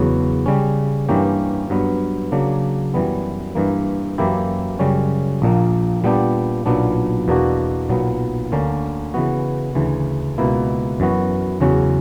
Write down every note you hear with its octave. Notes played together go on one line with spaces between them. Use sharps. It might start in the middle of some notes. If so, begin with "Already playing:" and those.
Already playing: E2 C#3 F#3 B3 F#4
C#3 G3 C#4
G2 E3 A#3 C#4 G4
G2 F#3 B3
C#3 F#3 A#3 D4
F#2 E3 G3 B3
G2 E3 A#3
F#2 E3 A#3 E4 G4
F#2 C#3 G3 C#4
A#1 A#2 A#3
A#2 G3 B3 D4 G4
B1 A#2 F#3 B3 D4
E2 B2 A#3 D4 F#4
B1 A#2 F#3 B3
D2 D3 A#3 C#4
C#3 E3 B3 F#4
D2 C#3 E3
C#2 B2 A#3 E4
F#2 E3 B3 F#4
E2 C#3 F#3 C#4 F#4